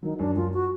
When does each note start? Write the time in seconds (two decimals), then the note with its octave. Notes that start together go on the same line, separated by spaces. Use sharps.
0.02 D#3 F#3
0.19 F#2 D4
0.36 F#2 F4
0.53 F#4